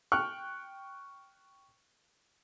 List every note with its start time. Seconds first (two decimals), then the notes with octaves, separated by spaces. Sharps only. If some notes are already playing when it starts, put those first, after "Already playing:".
0.12 G5 C#6 F6 F#6